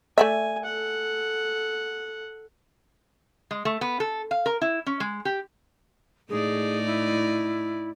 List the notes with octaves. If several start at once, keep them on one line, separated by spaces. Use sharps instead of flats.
A3 D5 E5 G#5
A4 F#5
G#3
A3
B3
A4
F5
A#4
E4
C#4
G#3
G4
A2 D#4 G#4 D5
E4